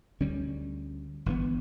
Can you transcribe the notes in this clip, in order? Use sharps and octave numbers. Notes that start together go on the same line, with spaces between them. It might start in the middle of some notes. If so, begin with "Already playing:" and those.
D2 D3 G3 C#4
G1 G2 E3 B3